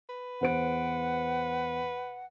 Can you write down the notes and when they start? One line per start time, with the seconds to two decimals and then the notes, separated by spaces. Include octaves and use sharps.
0.09 B4
0.41 E2 C5 F#5 D7